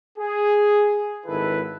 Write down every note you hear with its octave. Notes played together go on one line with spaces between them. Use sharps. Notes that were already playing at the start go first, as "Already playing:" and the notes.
G#4
G#1 D#3 E4 A4 B4